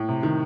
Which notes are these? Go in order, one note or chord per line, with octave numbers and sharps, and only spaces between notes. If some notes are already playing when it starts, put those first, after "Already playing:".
Already playing: A2
C3
D#3